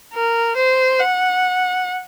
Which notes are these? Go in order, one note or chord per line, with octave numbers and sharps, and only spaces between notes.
A#4
C5
F#5